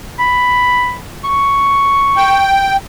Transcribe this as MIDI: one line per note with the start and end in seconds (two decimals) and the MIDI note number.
0.19 0.95 83
1.25 2.45 85
2.17 2.76 79